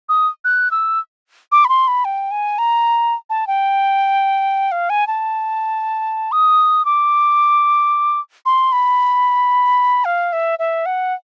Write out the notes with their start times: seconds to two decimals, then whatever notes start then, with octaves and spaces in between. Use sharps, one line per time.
0.09 D#6
0.45 F#6
0.71 E6
1.52 D6
1.65 B5
1.69 C6
1.88 B5
2.05 G5
2.31 G#5
2.58 A#5
3.30 A5
3.47 G5
4.72 F5
4.90 G#5
5.07 A5
6.32 D#6
6.85 D6
8.46 C6
8.72 B5
10.05 F5
10.33 E5
10.59 E5
10.86 F#5